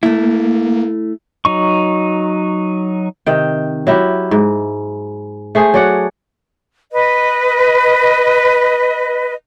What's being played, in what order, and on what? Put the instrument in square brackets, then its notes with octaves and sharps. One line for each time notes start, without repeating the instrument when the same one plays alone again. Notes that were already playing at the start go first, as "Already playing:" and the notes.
[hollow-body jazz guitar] A3 E4 [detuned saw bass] A#3
[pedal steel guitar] F#3 D#4 C#6
[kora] C3 D#3 G5
F#3 E4 G4
G#2
A3 G#4 C5
F#3 D5 F#5
[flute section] B4 D#5